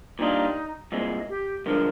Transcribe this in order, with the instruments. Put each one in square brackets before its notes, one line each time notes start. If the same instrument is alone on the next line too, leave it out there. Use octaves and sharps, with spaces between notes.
[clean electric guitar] A#2 G3 D4 F4 [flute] D#4
[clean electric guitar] C2 A#2 G#3
[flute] G4
[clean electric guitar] G2 D3 F3 G#3 [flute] A#4